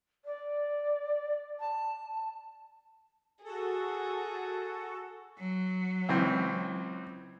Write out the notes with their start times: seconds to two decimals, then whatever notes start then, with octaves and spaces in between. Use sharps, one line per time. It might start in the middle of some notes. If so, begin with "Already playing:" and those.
0.25 D5
1.59 A5
3.44 F#4 G#4 A4
5.39 F#3
6.09 C#2 E3 C4